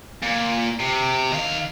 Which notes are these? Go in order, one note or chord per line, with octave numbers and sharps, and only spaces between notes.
A#2
C3
D#3 F5